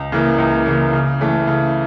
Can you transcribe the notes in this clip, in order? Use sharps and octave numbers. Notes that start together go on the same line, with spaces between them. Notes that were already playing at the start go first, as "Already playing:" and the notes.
Already playing: C#2
C#3 E3 A#3
C#2
C#3 E3 A#3
C#3
E3 A3
C#3